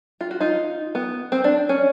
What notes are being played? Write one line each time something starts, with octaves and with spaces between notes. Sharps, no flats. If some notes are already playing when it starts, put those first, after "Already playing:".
F4
F#4
D#4 F4
B3
C4
D4
C#4